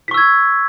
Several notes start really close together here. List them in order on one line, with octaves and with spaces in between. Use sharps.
B6 C#6 E6 G#6